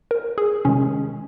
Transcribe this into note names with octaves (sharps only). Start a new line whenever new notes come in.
A#4
G#4
C3 D#3 G#3 C#4